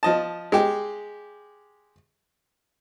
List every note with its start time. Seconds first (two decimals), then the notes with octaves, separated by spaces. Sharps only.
0.03 F3 D#5 A5
0.52 G#3 G4